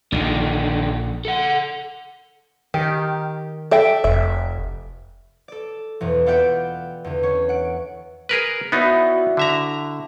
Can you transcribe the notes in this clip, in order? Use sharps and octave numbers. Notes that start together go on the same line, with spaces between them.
A#1 D3 D#3
A4 F#5
D#3 G4
A4 E5 G5
F1 E5
A4 D5
E1 E2
B3 F4 D5 E5 F#5 G5
E2 D3
C#4 C#5
F#5 D7
G#4 A#4 B4
B3 D#4 E4 F#4 D5
D3 E5 A#5